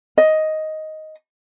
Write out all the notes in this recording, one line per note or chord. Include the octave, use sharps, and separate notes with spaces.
D#5